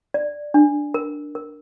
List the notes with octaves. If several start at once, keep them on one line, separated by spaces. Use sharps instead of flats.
D5
D4
A#4
A#4